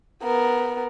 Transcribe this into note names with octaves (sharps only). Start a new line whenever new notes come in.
B3 A#4